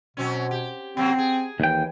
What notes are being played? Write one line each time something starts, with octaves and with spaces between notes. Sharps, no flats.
B2 F#3 C4 C#4
G4
C3 F#3 A#3 C4
G#4
D#2 E3 G5